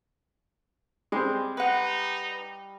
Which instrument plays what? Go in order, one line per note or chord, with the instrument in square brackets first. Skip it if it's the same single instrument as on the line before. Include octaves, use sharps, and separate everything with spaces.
[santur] G3 [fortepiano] G#3 C4
[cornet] D#4 [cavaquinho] B4 F#5